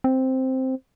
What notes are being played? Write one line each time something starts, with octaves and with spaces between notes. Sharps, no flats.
C4